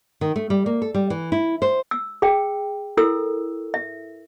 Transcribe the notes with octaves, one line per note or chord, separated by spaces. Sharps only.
D#3
A3
G3
A#3
A4
G3
E3
E4
C5
E6
G#4 G5
E4 A4 A#4 E6
E5